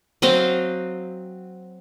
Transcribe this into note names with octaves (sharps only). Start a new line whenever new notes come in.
F#3 C4 D#5 F5